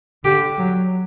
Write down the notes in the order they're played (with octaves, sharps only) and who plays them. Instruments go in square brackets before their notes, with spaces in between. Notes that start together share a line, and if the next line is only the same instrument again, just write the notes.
[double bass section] D3 [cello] G4
[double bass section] F#3